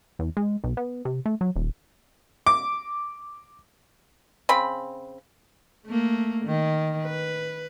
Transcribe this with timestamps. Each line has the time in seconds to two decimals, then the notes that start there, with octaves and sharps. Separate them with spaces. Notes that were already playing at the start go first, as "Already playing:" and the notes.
0.19 E2
0.37 G#3
0.64 B1
0.77 B3
1.05 C3
1.26 A3
1.41 F#3
1.56 D#1
2.47 D6
4.49 C#3 C4 B5
5.86 A3 A#3
6.45 D#3
7.03 B4